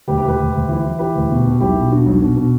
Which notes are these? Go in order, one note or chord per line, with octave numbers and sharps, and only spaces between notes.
D2 G4 B4
G4 B4
D2
G4 B4
D2
D2
E3
E3
E3 G4 B4
D2
B2
B2
B1 E4 G4
B2
B2 D4 F#4
B1
B2
B2